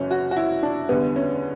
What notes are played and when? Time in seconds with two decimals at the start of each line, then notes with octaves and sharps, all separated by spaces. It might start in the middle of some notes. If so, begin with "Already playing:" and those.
Already playing: F#1 F#2 E3 C#4
0.11 F#4
0.31 F#4
0.37 E4
0.63 D4
0.89 E2 D3 G3 B3
1.16 C#4